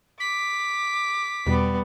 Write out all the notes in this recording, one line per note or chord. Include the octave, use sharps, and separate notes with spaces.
D6 B6
E2 B2 G3 B3